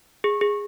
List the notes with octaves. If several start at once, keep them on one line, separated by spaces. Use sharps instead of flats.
G#4
G#4